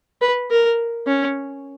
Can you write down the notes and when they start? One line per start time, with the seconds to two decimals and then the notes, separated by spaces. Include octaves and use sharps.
0.21 B4
0.51 A#4
1.07 C#4